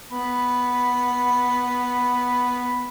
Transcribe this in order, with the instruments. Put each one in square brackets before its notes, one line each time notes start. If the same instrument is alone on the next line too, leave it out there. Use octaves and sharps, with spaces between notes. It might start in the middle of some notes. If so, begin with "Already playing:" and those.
[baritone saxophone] B3 [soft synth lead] B5